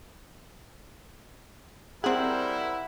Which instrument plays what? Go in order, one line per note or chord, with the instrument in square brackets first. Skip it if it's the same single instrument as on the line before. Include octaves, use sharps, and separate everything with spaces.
[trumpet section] G3 A#4 C5 [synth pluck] C4 G#4 [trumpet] E4 [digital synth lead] F#5